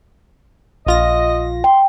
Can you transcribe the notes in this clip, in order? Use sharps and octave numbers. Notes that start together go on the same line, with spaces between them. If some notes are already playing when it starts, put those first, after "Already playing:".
A#1 F4 D#5 A#6
G5 C6